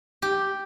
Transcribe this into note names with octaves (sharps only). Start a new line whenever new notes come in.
G4